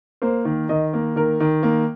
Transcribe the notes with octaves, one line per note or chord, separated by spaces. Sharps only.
A#3 C5
D#3
D#3 D#5
A#3
D#3 A#4
D#3
A#3